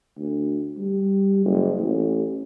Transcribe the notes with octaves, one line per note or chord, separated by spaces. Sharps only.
D2
G3
F#1
A1